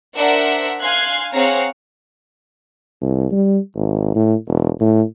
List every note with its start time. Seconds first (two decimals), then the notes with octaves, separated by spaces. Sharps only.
0.16 D4 A#4 C5 E5 F#5
0.82 F5 G#5 C6 F#6 G#6
1.33 C4 G#4 C#5 F5 F#5 A#5
3.02 C2
3.32 G3
3.75 G#1
4.15 A2
4.47 E1
4.81 A2